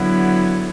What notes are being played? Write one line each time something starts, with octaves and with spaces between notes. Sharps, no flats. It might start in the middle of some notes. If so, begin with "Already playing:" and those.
Already playing: D3 F#3 B3 E4